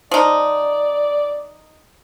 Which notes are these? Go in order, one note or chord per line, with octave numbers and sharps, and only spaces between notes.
F3 D#4 D5